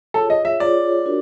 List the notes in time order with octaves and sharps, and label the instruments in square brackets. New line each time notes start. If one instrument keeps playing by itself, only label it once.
[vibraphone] F4 G#4 C#5 [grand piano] A4
[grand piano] D#5
E5
[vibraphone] F4 G#4 C#5 [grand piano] D5
[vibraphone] D4 F#4 A#4